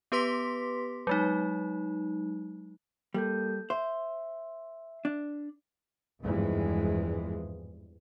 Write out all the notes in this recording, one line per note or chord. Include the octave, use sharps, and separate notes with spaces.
B3 G4 B4 C6 D6 B6
F#3 G#3 D#4
G3 A#3 A4 G6
C5 E5
D4
G#1 E2 G2 E3 F3 G#3